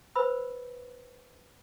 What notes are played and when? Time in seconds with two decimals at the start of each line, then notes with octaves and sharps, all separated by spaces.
0.16 B4 C5 B5 E6